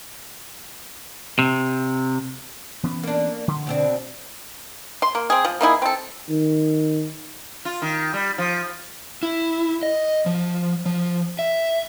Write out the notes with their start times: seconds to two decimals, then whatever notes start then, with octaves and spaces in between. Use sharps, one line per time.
1.39 C3
2.83 E3 B3 C#4
3.03 A#3 D4
3.48 D3
3.67 B2 C4 D4
5.02 C6
5.15 A#3
5.30 C4 G#4
5.45 F3
5.61 A#3 D#4 E4 G#4
5.82 C4 A4
6.30 D#3
7.65 F4
7.82 D#3
8.14 G3
8.38 F3
9.23 E4
9.83 D#5
10.26 F3
10.86 F3
11.39 E5